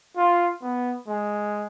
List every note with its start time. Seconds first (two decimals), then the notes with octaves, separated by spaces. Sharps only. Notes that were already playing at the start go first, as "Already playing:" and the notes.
0.16 F4
0.61 B3
1.07 G#3